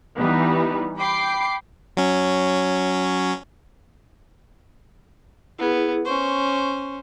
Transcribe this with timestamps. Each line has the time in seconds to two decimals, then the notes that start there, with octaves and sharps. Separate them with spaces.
0.16 E3 G3 B3 D#4
0.97 G5 B5 D6 C7
1.97 F#3 C#4
5.59 B3 E4 G#4
6.05 C#4 C5 C#6